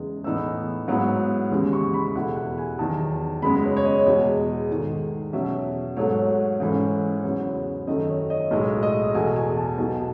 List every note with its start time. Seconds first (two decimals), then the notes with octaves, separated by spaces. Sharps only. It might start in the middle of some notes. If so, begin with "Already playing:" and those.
Already playing: E2 C#3 G#3 D#4
0.24 A2 E3 B3 D#4 E6
0.88 G#2 F#3 B3 E4
1.51 D#2 C#3 E3 G#3
1.73 C#6
1.94 B5
2.15 E2 B2 A3 E4 F#5
2.36 F#5
2.58 G#5
2.78 E2 D#3 F#3 A5
3.42 F#2 C#3 G#3 B3 B5
3.64 C#5
3.77 C#5
3.85 D#5
4.06 E2 B2 G#3
4.69 G#2 D#3 A3 D#4
5.33 E2 B2 F#3 C#4 E5
5.96 G#2 F#3 A3 C#5
6.60 G#2 E3 A3 C#4
7.23 E2 C#3 F#3 B3 C#5
7.87 F#2 D#3 A3 D#5
8.09 C#5
8.30 D#5
8.51 B1 A2 G#3 D#5
8.83 D#5
9.15 E2 B2 A3 G#5
9.36 G#5
9.57 A5
9.78 B1 B2 A3 D#4